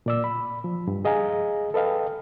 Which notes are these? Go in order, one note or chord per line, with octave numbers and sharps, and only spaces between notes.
A#2 D5 E6
B5
F3
G2
G#4 D#5 F5 G#5 A#5
A4 B4 D#5 F5 G5